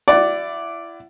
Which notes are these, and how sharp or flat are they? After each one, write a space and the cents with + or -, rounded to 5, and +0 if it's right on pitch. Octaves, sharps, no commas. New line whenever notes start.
E4 +30 D5 +0 F#5 +20